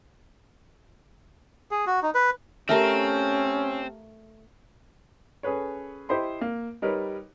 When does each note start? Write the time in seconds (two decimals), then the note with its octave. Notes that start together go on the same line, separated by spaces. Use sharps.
1.71 G#4
1.87 F#4
2.02 D#4
2.15 B4
2.69 A3 C4 C#4 G4 A#4 F5 A5 F6
5.43 C#4 G#4 A4 B4 C#5
6.09 E4 G4 C5 D#5 B5 C6
6.41 A#3
6.82 G3 D#4 A#4 B4 C#5